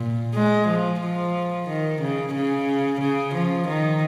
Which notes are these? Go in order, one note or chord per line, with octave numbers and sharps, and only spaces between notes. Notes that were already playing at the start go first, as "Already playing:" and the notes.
Already playing: A#2
G#3
F3
F3
D#3
C#3
C#3
C#3
F3
D#3